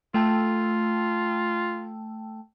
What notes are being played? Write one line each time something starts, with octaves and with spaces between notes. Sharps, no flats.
A3 F4 G5 A5